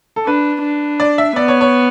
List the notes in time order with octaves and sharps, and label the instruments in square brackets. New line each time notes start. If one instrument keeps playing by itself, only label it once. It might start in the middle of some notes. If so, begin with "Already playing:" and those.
[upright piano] A4
[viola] D4 [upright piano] B4
[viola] D4
[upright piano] D5
E5
[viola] B3 [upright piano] D5
[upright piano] C#5
C#5